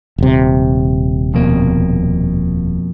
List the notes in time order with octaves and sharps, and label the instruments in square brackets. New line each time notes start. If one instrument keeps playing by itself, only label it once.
[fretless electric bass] D#1 C3
[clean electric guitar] F2 B2 A#3